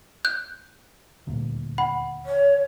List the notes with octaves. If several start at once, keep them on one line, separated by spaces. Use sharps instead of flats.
F#6 G6
D#1 D2 A#2
F#5 B5
C#5